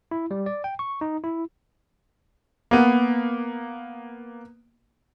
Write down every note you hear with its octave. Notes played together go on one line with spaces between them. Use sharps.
E4
G3
D5
G5
C#6
D#4
E4
A#3 B3